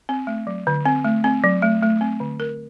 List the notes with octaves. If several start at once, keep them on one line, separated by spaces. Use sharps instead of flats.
C4
A3
F#3
D3
C4
A3
C4
F#3
A3
A3
C4
D3
A#4